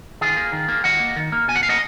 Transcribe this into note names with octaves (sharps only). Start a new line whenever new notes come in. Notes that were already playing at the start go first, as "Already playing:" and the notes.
D#3 F4 G#4
A#3
D#3
A#3
D#3 D#5 F#5
A#3
D#3
A#3
B2 G#5
F#5
A#3 F5
D#5 F#5